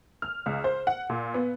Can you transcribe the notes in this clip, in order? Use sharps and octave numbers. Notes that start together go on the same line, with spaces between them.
F6
C#2
C5
F#5
A#2
B3